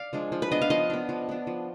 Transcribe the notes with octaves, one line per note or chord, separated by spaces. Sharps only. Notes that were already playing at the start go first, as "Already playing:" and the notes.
Already playing: D5 F5
F3 G#3 D4
F3
B4
B3 D4 D#5
F5
F3 D#5
B3 D4
F3
B3 D4
F3